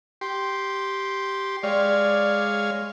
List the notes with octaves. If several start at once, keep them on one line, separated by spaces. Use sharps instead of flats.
G4 C6
G#3 C#5 D5 F5